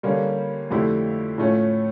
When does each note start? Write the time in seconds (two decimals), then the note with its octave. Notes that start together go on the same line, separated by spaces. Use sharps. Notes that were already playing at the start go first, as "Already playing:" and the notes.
0.03 D3 G3 A#3 C#4
0.71 F2 D3 A3 E4 G4
1.38 A2 F3 A3 C#4